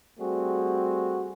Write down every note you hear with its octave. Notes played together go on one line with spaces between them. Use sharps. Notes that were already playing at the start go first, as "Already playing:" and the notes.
G3 A3 C4 F#4 G#4